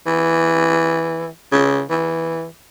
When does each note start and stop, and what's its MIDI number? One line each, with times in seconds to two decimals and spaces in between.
0.06 1.28 52
1.52 1.83 49
1.90 2.47 52